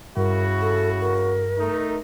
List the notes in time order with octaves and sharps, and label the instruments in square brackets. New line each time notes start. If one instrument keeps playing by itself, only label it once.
[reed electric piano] G2 [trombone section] C#3 E4 F#4 [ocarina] A#4
[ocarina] A4
A#4
[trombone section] A3 D#4